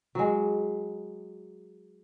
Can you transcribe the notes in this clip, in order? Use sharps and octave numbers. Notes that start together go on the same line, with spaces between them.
F#3 G#3